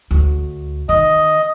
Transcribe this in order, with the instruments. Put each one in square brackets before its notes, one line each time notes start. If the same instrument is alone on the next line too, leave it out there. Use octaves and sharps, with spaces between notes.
[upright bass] D2
[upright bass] D#3 [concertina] D#5